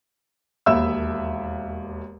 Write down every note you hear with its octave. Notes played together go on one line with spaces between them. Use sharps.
E1 D#2 E5 B5 E6